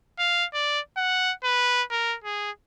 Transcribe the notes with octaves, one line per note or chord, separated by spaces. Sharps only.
F5
D5
F#5
B4
A#4
G#4